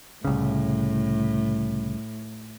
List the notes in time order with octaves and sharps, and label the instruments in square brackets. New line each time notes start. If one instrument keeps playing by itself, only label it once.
[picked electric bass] C2 C#3 [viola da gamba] A2